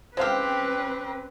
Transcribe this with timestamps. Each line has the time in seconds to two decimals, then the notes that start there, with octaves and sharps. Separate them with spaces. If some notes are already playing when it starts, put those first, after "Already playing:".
0.17 G#3 C4 C#4 G4 B4 C5 F5